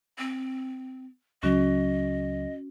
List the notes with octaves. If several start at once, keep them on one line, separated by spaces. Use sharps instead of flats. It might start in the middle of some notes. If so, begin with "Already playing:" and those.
C4
C#2 C#3 F#3 C#4 F#4 D#5